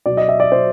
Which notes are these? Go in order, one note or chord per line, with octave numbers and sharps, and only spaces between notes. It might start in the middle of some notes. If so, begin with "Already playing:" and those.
B2 F#3 D5
D#5
E5
D5
B2 F#3 C5